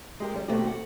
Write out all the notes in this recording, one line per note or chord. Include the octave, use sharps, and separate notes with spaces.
G#3 G4 A#4
F#2 G3
B2 D#3 A3 C4 F#4 G4
F#5